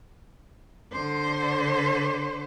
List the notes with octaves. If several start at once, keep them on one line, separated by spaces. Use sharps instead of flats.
D3 C5